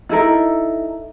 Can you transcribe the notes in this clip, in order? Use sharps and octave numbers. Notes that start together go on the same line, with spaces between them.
D#4 E4 A4 A#4